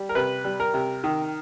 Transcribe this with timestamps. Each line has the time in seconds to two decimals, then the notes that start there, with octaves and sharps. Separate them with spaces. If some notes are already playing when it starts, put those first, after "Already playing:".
Already playing: G3
0.09 A#4
0.15 C3 B4
0.44 G3
0.60 A#4
0.74 C3
1.04 D#3